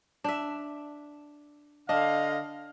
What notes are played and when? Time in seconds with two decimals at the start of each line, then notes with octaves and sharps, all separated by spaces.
0.24 D4 E5
1.89 D3 D4 D#5 F5